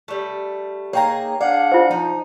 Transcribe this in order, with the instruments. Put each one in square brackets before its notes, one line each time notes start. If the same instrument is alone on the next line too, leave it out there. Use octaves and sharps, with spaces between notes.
[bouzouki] G3 A3
[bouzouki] A#3 D#4 G#4 [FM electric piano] C#5 G5 A#5
[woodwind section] D4 F5 F#5 [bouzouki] G#4 [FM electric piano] D5
[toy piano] F4 C5
[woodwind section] F3 [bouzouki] D#4